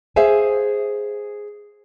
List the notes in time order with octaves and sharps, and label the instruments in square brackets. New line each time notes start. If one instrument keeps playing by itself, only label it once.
[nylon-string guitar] G#4 C5 E5 F5 G#5